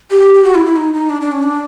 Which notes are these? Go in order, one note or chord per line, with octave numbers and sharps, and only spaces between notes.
G4
G4
F#4
E4
E4
D#4
D#4
D4
D4
C#4
D4